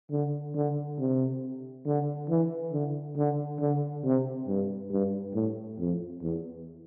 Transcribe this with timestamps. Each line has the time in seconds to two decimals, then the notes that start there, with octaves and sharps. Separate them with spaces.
0.11 D3
0.54 D3
0.99 C3
1.86 D3
2.29 E3
2.72 D3
3.16 D3
3.60 D3
4.03 C3
4.47 G2
4.91 G2
5.34 A2
5.78 F2
6.22 E2